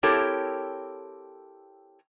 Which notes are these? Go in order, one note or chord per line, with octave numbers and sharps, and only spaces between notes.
C4 E4 G4 A4 A#4 C#5